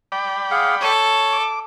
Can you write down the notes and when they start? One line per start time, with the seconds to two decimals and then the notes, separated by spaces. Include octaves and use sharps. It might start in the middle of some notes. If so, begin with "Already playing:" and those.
0.12 D5 G5 B5
0.51 G#4 F5 F#5
0.81 A4 C#5
1.33 D6